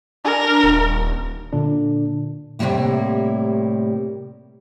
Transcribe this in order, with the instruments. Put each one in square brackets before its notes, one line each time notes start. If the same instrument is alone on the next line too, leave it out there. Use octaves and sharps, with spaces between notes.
[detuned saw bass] D4 [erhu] A#4
[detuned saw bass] D#1
[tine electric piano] A#2 D3 D4
[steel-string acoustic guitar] A2 C3 E3 G3 A#3 E4